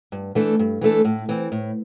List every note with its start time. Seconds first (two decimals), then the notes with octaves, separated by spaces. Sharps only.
0.12 G2
0.35 E3 A3 D4 A4
0.59 G2
0.81 E3 A3 D4 A4
1.05 A2
1.29 E3 C4
1.52 A2